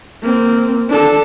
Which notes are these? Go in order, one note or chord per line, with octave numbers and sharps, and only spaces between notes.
A#3 C4
D4 A4